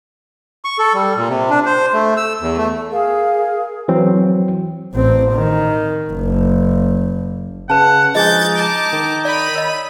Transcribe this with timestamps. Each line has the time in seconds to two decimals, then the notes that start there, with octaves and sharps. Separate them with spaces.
0.65 C#6
0.79 A4
0.94 G3
1.16 A#2
1.29 C3
1.50 D4
1.66 C5
1.93 A3
2.17 E6
2.41 E2
2.57 A3
2.90 G#4 A#4 F5
3.88 E3 F#3 C4
4.94 A1 C4
5.32 D#3
6.11 F#1
7.70 C#3 B4 F#5 A5
8.15 F3 G#3 D4 D#4 G#4 D#5 G6 A6
8.55 A5 D6
8.93 D#3
9.25 D5 B5 D#7
9.55 C#5 D#5 E6